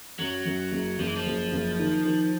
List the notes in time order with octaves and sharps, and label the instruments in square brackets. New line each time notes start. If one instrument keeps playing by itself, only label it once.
[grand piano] F#2 [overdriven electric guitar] F#3
[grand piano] F#2
F#1
[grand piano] F#1 [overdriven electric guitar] F3
[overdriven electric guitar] E3
F3
[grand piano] F#1
F#1
D#3
D#3